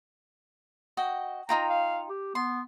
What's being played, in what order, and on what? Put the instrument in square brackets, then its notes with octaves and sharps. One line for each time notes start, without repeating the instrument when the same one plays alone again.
[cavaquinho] F#4 D#5 G5
[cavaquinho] D#4 F4 G5 [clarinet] A#5
[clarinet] F5
G4
[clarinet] B3 [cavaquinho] C6